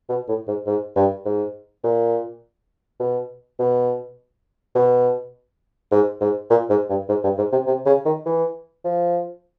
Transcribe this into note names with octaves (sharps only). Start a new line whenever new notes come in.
B2
A2
G#2
G#2
G2
G#2
A#2
B2
B2
B2
G#2
G#2
A#2
G#2
G2
G#2
G2
G#2
C3
C3
C#3
D#3
E3
F3